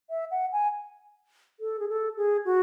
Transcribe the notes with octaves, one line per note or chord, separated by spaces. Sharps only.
E5
F#5
G#5
A4
G#4
A4
G#4
F#4